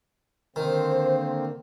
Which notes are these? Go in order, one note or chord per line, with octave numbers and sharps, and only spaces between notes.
D3 D#3 A#3 C4 C5